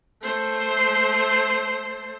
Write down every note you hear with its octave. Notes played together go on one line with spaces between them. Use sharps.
A3 C5